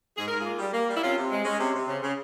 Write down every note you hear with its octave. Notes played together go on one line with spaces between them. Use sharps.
G#2 G#4
G#2 A#4
F4 G#4
A#3
G3
A#3
G3
E4
C3 C#4 F4
C3
G#3
G#3 C#4
C3
C3
C#3
C#3